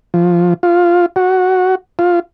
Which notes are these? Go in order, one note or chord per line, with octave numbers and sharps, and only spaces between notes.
F3
F4
F#4
F4